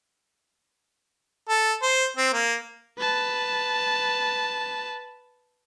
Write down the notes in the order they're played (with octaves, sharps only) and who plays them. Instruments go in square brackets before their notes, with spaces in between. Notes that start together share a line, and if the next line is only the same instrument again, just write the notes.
[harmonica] A4
C5
C4
A#3
[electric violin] B4 A5